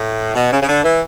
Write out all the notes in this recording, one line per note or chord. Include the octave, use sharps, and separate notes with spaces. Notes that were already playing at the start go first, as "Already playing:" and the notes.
Already playing: A2
B2
C#3
C#3
D3
E3